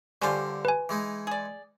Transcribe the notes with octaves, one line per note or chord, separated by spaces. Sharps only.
G2 D3 C#4 F4 G4 C5
B4 G#5
E3 G#3 D#4
G#4 D5